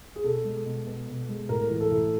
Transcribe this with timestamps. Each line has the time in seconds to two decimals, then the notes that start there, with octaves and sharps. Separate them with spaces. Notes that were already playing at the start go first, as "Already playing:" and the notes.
0.16 G#4
0.24 B2 A4
0.45 G#3
0.66 B2
0.87 B3
1.08 B2
1.29 G#3
1.49 A2 A#4
1.70 E3
1.80 A4
1.91 A2